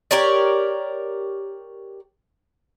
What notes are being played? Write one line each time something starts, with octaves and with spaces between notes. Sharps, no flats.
G4 A#4 C#5 D5